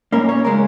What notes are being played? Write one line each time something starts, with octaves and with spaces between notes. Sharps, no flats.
A#2 A#3 C#4 A#4
C#5
C#3 G#3 C#4 A#4